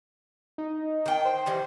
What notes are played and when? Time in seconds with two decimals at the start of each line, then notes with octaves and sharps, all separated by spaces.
0.58 D#4
1.06 D#3 G5
1.25 C5
1.46 D#3 E3 G3 C5